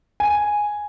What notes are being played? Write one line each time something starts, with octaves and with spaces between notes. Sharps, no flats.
G#5